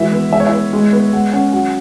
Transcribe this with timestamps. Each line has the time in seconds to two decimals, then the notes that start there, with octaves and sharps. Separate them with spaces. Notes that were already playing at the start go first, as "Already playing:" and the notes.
Already playing: E3 G#3 E4 F#4 E5
0.12 B3
0.33 G#3 E5
0.40 C#5
0.47 E4 E5
0.53 B3
0.73 G#3
0.93 B3
1.13 G#3 F#5
1.33 C#4 F#5
1.53 F#3 F#5